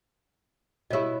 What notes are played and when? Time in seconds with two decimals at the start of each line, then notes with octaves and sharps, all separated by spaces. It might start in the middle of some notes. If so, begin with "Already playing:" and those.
0.91 B2 E4 G4 C#5 D#5